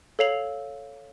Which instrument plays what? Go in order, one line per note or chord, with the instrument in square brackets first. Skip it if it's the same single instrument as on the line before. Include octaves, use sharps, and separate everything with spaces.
[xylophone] A4 C#5 F5 C7 F7 F#7